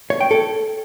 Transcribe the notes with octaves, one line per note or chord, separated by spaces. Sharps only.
C#5
G5
A4